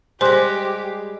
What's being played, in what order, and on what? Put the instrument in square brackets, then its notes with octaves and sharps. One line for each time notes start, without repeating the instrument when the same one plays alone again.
[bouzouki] G3 G#3 [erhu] G4 [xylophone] C5 [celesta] G#5 C6 F#6